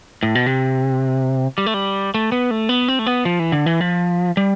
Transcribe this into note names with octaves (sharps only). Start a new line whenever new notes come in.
A2
B2
C3
G3
A3
G3
A3
B3
A3
B3
C4
A3
B3
F3
E3
D3
E3
F3
G3